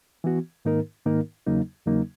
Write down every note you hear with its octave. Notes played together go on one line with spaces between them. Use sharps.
E3 B3 F#4
G#2 D#3 A#3 D#4 A#4
G#2 D#3 A#3 D#4 A#4
E2 C#3 F#3 A#3 D#4
E2 C#3 F#3 A#3 D#4